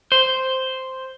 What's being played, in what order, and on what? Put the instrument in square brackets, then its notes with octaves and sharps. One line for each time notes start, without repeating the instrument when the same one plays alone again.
[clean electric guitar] C5